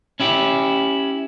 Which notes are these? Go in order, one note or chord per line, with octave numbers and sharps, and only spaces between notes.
C#4 E4 G4